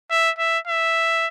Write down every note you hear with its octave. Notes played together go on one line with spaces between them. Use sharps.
E5
E5
E5